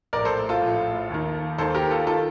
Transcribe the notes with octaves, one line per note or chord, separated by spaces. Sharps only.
A#1 A2 A#4 D5
A4 C5
F4 A4
A#1 A2
D#2 D#3
D#2 D#3 A4 C5
G4 A#4
F4 A4
D#3 F4 A4